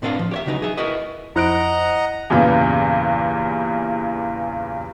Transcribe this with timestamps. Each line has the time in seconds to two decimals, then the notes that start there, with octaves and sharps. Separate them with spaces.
0.02 A2 C4 D4 B4 C5 F5
0.19 F3
0.31 G4 C#5 E5
0.46 C#2 C#3 F#3 D#4 B4
0.62 G#4 E5
0.77 E4 F#4 A#4 B4 D#5
1.36 F2 E4 C5 D#5 F#5 A#5 F#6 D7
2.30 E2 G2 A#2 C#3 E3